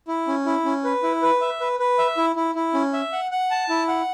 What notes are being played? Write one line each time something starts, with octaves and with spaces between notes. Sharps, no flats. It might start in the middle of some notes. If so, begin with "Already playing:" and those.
E4
C#4
E4
C#4
B4
E4
B4
E5
B4
B4
E5
E4
E4
E4
C#4
E5
F#5
F#5
A5
E4
F#5